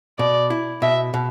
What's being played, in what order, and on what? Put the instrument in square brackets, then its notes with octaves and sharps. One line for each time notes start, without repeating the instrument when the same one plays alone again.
[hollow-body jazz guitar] B2 [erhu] D5
[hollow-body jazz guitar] E4
[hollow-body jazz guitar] B2 [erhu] E5
[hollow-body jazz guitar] B2